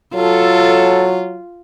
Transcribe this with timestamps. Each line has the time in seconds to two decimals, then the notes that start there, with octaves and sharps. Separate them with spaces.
0.15 F#3 F4 A4